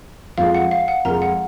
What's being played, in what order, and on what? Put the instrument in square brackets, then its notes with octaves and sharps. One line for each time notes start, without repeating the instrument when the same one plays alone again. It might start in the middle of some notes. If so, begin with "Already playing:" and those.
[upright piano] F2 F3 G#3 [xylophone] F5
[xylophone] F#5
F5
F#5
[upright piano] F2 F3 G#3 [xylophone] A#4 A#5
[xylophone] F#5